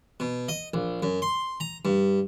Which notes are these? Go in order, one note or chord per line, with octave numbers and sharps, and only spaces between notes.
B2
D#5
A#1
F#2
C6
A#5
G2